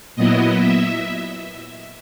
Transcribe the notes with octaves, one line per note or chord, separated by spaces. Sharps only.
A#2 F#3 B3 E4 D#5
E5